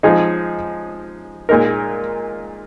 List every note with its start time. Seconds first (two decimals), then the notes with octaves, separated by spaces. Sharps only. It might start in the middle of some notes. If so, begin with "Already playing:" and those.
0.03 F3 G#3 D#4 G#4
1.49 A#2 G#3 D#4 A#4